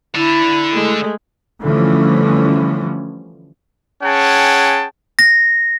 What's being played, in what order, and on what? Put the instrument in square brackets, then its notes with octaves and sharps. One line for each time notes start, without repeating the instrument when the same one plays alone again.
[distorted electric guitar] D3 D4 [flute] E4
[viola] G#3 A3
[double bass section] D3 E3 F3 G3 A3 C#4
[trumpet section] C#4 G#4 F#5 G5 A5
[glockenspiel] A#6